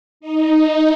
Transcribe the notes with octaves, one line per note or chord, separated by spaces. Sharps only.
D#4